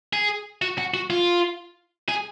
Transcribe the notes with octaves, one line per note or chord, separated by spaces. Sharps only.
G#4
F#4
F#4
F#4
F4
G#4